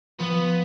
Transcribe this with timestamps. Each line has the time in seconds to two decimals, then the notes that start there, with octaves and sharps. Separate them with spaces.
0.19 F3 B3